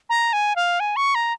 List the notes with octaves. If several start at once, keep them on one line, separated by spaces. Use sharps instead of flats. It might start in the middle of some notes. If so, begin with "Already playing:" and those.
A#5
G#5
F5
G#5
C#6
A#5